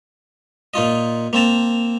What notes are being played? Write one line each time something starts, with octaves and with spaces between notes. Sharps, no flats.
A#2 D#4 F4 D#5
A#3 C4 A5 A#5